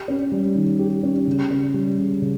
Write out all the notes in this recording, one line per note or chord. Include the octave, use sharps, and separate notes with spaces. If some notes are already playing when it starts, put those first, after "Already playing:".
Already playing: G4
C#4
G3
D#3
G4
C#4
C#3
C#4
G3
C#3
C#3